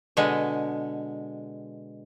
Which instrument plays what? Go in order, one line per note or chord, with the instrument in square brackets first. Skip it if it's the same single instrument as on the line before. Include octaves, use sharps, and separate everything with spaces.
[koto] B2 D3 G#3